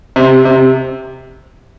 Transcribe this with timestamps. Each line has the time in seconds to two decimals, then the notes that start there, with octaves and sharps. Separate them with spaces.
0.16 C3
0.45 C3